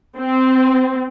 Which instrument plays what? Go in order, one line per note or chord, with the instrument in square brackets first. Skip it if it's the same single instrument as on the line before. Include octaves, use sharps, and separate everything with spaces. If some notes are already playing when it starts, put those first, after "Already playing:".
[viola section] C4